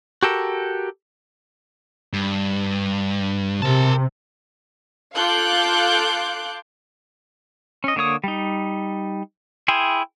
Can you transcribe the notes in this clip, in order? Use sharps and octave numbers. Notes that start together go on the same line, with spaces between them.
F#4 G4 A4 A#4
G2
C3 A#4 A5
F4 A4 F5 D6 F#6 G6
C#4 D#5
D3 A#3 C#5 D#6
G3 D#4
E4 G#4 G5 C6